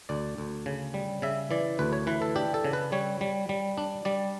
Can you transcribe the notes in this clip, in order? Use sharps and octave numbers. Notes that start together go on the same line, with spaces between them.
D2 D5
D2
C#3
G3
C#3 E5
E3 D5
D2 B4
C#5
E3 B4
A4
D4 G4
A4
C#3
B4
G3 C#5
G3
G3
D4
G3 D5